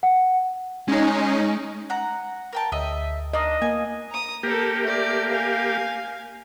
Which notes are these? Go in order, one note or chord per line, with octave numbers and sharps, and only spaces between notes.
F#5
G#3 C#4 D#4
F#5 A#5
A#4 G5 A5
D2 D#5 E5
A#3 D4 D#5
A#3 G#5
A#5 D#6
A#3 G4 A4 A#4
A3 D5
F5 G#5